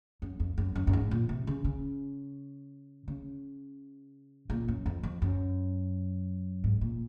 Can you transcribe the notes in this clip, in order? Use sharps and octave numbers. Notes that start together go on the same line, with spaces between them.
F#2
F2
F#2
F#2
F#2
G#2
A#2
C3
C#3
C#3
C#3
A#2
F#2
F2
F2
F#2
G#2
A#2